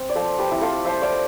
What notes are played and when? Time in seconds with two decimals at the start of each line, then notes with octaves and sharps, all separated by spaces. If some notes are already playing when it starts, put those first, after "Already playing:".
Already playing: C4
0.09 D5
0.15 F3 A4 C5
0.38 G4 B4
0.51 C4 E4
0.61 F4 A4
0.85 F3 C5 E5
1.02 D5 F5